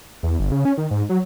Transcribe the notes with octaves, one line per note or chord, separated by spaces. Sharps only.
E2
G1
C#3
C#4
D#3
G#2
F#3